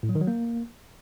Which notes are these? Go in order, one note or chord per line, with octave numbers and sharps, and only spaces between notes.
A2
F#3
D#3
F#3
A#3